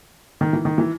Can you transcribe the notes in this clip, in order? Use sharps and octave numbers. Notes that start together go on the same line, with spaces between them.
D#3
E3
D#3
E3